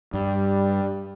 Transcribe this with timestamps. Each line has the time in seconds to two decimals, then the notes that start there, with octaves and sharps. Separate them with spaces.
0.14 G2 G3